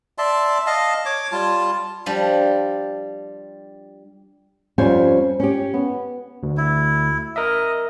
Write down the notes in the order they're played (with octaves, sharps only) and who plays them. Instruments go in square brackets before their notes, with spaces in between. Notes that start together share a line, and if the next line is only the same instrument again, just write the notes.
[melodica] D5 E5 A5 C6
D#5 F5 A5
C#5 D6
G3 F4 A5
[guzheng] F3 G3 D4
[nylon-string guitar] F2 G3 C#4 C5 G#5
C#4 G4
B3
[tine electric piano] D2
[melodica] E4
[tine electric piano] A#4 E5 [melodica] D#5